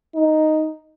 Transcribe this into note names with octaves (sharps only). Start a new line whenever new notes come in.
D#4